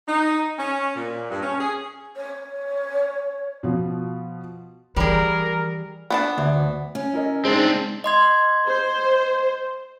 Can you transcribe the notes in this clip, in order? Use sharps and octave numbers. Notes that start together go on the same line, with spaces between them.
D#4
C#4
A#2
G2
C#4
G#4
C#5
B2 F3
E3 G3 G#4 A#4
B3 D4 A5
D2
C#4
E4 A#4 D#5
G#3 C4 D4 D#4 C5
D#5 C6 G#6
C5